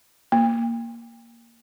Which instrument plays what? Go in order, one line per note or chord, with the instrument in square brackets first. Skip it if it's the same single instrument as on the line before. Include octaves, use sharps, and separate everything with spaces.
[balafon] A#3